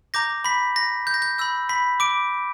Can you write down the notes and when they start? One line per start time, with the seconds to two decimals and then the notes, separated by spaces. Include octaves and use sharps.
0.14 A#5 D6 G6 A#6
0.44 B5 B6
0.76 A#6
1.07 G6
1.14 A#6
1.22 G6
1.38 B5 E6 G6
1.69 B5 B6
2.00 D6 D7